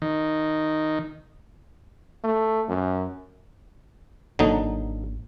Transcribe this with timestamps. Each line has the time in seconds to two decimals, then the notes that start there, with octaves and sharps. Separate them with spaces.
0.02 D#3
2.24 A3
2.68 F#2
4.39 G#1 D3 F#3 A#3 D4 D#4